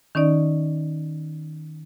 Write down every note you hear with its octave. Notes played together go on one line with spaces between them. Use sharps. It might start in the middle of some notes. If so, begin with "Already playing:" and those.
D#3 C#4 D#4 D5